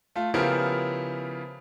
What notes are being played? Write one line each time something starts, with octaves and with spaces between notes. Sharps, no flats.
A3 F4
C#3 F3 B3 E4 G4 A#4